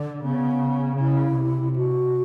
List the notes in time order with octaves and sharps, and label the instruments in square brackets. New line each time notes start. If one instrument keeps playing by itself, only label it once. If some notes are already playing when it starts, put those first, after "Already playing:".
Already playing: [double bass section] D3
[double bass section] C#3 [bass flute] B3
[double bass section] C#3 [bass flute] E4
[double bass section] C3
[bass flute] F#4